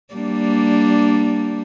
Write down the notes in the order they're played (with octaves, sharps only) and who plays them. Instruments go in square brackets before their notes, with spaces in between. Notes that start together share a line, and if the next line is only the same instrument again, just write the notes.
[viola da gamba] G3 A#3 D4